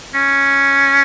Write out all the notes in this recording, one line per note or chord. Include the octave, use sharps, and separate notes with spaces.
C#4